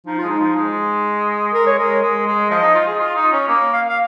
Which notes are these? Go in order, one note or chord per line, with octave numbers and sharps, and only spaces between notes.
F3 D#4
F4
G#3
D#4
F3
G#3
G#3 A#4
C#5
G#3 A#4
G#3
G#3
F3 D#5
D#4
F4
G#4
F4
D#4
C#4
A#3
F5
F5